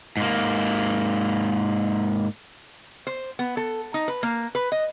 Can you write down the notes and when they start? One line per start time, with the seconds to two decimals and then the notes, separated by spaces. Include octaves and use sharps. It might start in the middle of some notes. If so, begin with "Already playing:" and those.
0.17 G#2 A#3
3.07 C5
3.39 B3
3.57 A4
3.94 D#4
4.08 B4
4.23 A#3
4.55 B4
4.72 D#5